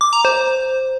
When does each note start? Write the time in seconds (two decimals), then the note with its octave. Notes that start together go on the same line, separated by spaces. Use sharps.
0.01 D6
0.13 A#5
0.25 C5